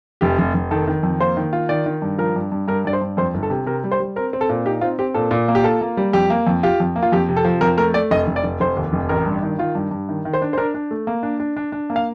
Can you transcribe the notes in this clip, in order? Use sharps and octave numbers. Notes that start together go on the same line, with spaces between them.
F1 G4
F1
F1
D#3 A4
D#3
F2
A#3 C5
D#3
F4
D#3 D5
D#3
G2
F3 A#4
G2
G2
G2 A#4
G2 D5
C5
G2
F2 C5
G1
A4
C3
C3 A#4
G3
C5
G3
C4 A#4
C4
A4
A#2
D#4 G4
C4 F4
C4 G4
A#2 A4
A#2
A#3
G4
F4 A4
A#3
G3
F2 G4
A#3
F2
F4 G4
F2
A#3
F4
F2 G4
C3
A4
F3
F2 A#4
A3 A#4
A3 D5
F1 D#5
F1
D5
F1
F1 C5
D#2
F1
A1 A#4
G2
D#3
D#3 F4
G2
G2
D#3
D#3
C5
D4
C5
D4 A#4
D4
A3
A#3
D4
D4
D4
D4
A#3
F5